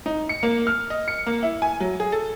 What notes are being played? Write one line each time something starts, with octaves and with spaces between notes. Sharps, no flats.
D#4
C#7
A#3
F6
D#5
C#7
A#3
E4
G#5
F#3
G#4
A4